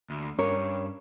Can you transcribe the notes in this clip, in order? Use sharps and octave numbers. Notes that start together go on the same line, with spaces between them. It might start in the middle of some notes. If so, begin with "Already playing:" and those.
D2
G2 C#4 A#4 C#5